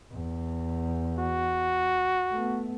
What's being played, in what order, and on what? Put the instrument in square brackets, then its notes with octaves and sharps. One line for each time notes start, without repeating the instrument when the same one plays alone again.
[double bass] E2
[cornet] F#4
[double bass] A3 B3